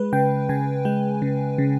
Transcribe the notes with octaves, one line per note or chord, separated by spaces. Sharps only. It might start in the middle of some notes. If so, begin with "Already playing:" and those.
Already playing: G#3 B4
C#3 G5
C#3 G#5
G#3 G5
C#3
C#3